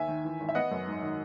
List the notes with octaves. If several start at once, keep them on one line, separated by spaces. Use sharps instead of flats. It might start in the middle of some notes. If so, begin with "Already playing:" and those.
Already playing: D#2 E5 G#5
D#3
E3
G#1
E5
B3 D#5 F#5
F#2
G#2
D#3